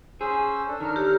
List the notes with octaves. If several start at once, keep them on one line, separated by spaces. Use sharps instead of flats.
C#4 G#4 C5 E6
D4 A4
D#3 A#5 F6
G4 C#5